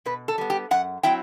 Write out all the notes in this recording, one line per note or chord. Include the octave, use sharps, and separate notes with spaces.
B2 B4
A4
G3 B3
G4
F#2 F#5
F#3 C4 E4 G5